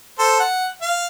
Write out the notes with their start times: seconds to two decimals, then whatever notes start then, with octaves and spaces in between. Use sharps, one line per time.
0.19 A4 C5
0.40 F#5
0.82 F5